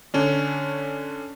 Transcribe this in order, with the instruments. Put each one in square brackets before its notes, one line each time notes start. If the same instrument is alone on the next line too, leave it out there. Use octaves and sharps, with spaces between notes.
[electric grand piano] D3 C#4 D4